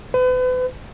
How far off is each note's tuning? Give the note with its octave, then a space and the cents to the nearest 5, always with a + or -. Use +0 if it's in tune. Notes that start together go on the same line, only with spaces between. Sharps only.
B4 +40